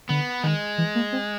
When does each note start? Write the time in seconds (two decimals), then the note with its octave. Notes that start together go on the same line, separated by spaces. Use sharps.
0.09 D3 B3
0.44 D#3 G#3
0.78 E3
0.95 A#3
1.13 C4